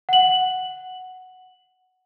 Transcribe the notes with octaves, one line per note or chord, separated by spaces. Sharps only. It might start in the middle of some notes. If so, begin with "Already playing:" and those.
F#5 F#7